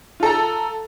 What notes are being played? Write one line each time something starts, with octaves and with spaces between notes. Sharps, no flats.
F4 A4 A#5